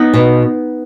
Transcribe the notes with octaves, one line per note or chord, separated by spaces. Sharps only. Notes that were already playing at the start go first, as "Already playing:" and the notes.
Already playing: B3 D#4
B2